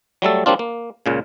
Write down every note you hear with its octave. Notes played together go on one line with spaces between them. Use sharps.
F#3 G3 A3 A4
F#3 G3 A#3 C4 D4 F4
A#3
C#2 A#2 C#3